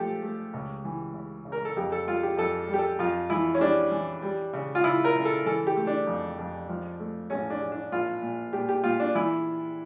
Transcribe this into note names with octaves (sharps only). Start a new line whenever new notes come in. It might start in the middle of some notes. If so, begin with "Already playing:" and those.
Already playing: F3 A3 G4 A4
A3
C#2
E3
C#3
C#3
A#4
A4
F2 G4
A4
G3 F4
G4
F2 A4
G3
G4
A4
F2 F4
E3 E4
C#4
G3 D4
E3
G3
C#3
F4
C#3 E4
A#4
C#3
A4
E3 A4
G4
A3
D4
F2
F2
F3
A3
A1 C#4
D4
A1
D4
A#1 F4
A#2
A#2 G4
G4
A#2 F4
D4
E3 E4